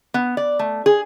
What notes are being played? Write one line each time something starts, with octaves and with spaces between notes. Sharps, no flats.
B3
D5
A3
G#4